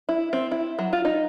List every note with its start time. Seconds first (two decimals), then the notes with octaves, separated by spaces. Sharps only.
0.09 E4
0.33 C4
0.51 E4
0.79 F#3
0.93 F4
1.05 D#4